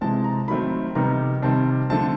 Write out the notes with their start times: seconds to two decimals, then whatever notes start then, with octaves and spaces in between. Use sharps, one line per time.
0.01 C3 E3 G#3 C4 A5
0.24 A#5
0.48 D#3 F#3 A3 C4 B5
0.95 C3 D#3 G3 B3 D#4 A#5
1.42 C3 D#3 G3 C4 A5
1.90 D3 F3 A3 C4 A5